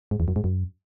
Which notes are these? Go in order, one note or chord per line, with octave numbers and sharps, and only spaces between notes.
G#2
E2
F#2
G#2
F#2